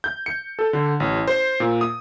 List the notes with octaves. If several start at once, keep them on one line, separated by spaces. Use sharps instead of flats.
G6
C#7
A4
D3
A1
C5
A#2
D#6